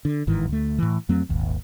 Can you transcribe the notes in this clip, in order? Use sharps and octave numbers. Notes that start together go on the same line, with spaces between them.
D3
G1 G#2 D#3 E3
D2 A3
A2 E3
F2 F#3 A3 C4
D#1 G#1 D#2